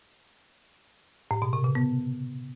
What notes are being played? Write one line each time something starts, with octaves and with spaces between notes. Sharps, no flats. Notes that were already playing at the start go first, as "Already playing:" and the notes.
A2
B2
C3
C#3
B3